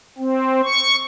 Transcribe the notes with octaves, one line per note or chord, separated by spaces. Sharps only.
C4
C#6